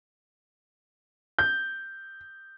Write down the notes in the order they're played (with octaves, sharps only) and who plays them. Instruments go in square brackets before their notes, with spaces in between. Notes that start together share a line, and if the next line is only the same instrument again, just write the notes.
[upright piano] G6